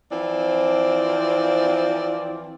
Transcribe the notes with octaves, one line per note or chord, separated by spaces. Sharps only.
E3 F3 C4 D5